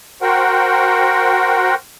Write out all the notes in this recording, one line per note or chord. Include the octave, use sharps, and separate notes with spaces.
F#4 A#4 C5 F#5 G5